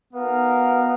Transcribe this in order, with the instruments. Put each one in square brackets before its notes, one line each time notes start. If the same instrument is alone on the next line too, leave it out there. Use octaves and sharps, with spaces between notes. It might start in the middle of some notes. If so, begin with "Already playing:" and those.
[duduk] B3 [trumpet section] D#4 F#4 A#4 F5